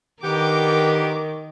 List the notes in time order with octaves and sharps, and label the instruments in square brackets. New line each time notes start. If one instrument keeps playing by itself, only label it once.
[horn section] D3 B3 G4 [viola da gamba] D#3 [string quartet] A#4 D6